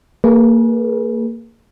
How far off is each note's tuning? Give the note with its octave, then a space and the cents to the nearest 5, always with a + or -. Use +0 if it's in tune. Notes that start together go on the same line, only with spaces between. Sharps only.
A#3 -25 G#4 +20 B4 -35